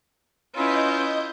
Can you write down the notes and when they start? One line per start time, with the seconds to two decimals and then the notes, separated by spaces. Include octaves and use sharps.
0.55 C#4 E4 F4 B4 D#5 G6